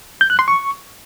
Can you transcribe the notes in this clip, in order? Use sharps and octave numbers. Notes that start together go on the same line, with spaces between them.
G6
F#6
C6
C#6